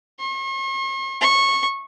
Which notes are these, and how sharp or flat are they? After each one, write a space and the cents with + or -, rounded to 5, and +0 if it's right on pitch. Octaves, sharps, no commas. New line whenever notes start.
C#6 -45
C#6 -15